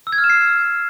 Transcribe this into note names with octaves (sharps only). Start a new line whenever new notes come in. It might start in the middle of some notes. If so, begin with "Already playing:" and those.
E6
G#6
F6
E7
C7